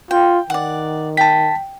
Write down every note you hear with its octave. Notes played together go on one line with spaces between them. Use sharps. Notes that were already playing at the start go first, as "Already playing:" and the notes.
F4 G5
D#3 D5 F#5
G5 A5 B6